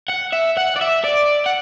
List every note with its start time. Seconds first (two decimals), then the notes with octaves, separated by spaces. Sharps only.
0.09 F#5
0.33 E5
0.57 F#5
0.76 D5
0.81 E5
1.04 D5
1.46 F#5